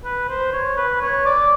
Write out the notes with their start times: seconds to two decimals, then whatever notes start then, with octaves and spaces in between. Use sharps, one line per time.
0.05 B4
0.29 C5
0.53 C#5
0.77 B4
1.01 C#5
1.25 D5